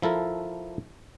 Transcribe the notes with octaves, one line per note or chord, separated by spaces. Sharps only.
F3 E4 A4 A#4